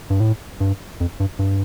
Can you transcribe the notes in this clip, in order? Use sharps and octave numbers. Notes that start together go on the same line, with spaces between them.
G2
A2
G2
F2
G2
G2